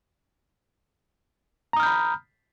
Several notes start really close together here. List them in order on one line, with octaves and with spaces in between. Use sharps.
A#5 D#6 F6 G6 B5